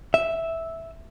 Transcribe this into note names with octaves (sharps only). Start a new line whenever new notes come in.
E5